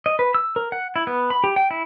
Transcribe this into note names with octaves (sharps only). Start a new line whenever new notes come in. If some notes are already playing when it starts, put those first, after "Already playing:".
D#5
B4
E6
A#4
F#5
E4
B3
B5
G4
G5
E4